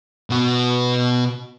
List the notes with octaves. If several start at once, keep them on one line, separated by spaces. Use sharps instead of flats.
B2 F#4